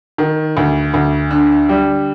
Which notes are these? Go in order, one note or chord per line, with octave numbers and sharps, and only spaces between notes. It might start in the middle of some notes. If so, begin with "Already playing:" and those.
D#3
D2
D2
D3
G3